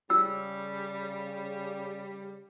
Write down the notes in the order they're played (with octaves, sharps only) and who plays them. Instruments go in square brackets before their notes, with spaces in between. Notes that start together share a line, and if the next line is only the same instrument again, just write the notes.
[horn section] C#3 G3 [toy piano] E6